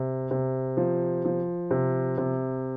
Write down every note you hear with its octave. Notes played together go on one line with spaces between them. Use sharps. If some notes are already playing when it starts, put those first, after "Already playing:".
Already playing: C3
C3
F3
F3
C3
C3